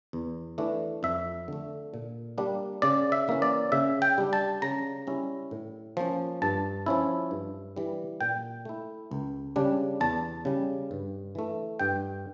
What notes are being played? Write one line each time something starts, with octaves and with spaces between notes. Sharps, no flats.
E2
E3 A3 D4
F2 E5
D3 A3
A#2
G3 A#3 D4
C#3 D5
E5
E3 A#3 C#4
D5
C#3 E5
G5
G3 D4
A5
C#3 A#5
G3 C#4 E4
A2
F3 A#3 C#4
G2 A5
F3 C#4 E4
G2
E3 G3
A#2 G5
A3 E4
C#2
C#3 G3 D4
E2 A5
C#3 G3
G2
E3 A3
G2 G5